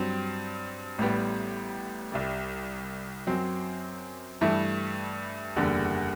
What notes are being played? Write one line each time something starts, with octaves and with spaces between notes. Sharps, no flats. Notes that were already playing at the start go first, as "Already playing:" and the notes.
Already playing: G2 F#3 C4
A1 A2 G3 B3
C2 C3 G3
F#2 F#3 C4
G2 E3 A3 E4
F#1 E2 D3 G3